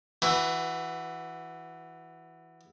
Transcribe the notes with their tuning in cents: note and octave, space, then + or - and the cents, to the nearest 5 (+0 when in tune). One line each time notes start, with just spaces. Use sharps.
E3 +0 F#4 +0 B4 +25